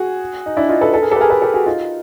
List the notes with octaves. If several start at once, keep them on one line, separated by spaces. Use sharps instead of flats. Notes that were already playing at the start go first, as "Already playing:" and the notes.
Already playing: F#4 G#4
D#4
D4 E4
D#4 F4
A4 B4
A4 B4
G#4 A#4
G4 A4 B4
G#4 A#4
A4 B4
G4 A4
F#4 G#4
D#4 F4